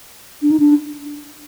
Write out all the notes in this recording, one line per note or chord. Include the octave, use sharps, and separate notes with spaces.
D4
D#4
D4